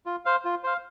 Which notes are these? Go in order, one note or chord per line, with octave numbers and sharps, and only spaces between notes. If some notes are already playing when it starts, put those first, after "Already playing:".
F4
C5 F5
F4
C5 F5